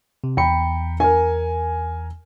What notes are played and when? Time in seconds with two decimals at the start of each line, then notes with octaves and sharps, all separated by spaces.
0.24 C3
0.37 E2 G5 A#5 B5 C#7
1.00 A#4 G#5